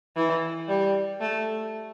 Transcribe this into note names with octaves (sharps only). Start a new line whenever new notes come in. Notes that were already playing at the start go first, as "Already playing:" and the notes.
E3
G3
A3